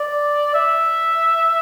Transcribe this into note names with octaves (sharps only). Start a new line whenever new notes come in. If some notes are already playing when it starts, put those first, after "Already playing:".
Already playing: D5
E5